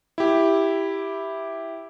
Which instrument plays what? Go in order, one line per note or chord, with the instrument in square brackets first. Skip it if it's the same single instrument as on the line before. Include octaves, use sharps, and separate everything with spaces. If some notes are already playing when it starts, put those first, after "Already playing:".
[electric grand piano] E4 G4